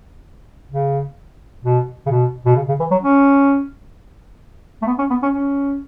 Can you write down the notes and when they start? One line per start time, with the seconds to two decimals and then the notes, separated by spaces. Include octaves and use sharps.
0.72 C#3
1.64 B2
2.06 C#3
2.11 B2
2.46 B2
2.56 C#3
2.68 C#3
2.80 E3
2.91 F#3
3.03 C#4
4.82 A3
4.87 B3
4.98 C#4
5.10 B3
5.22 C#4
5.33 C#4